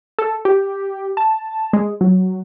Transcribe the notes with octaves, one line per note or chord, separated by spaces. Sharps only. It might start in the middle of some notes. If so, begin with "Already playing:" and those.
A4
G4
A5
G#3
F#3